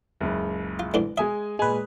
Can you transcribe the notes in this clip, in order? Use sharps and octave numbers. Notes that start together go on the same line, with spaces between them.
F#1 C#2
F4
G#2 D3 E3
G#3 E5 G#5 D#6
A#2 G#3 B4 G#5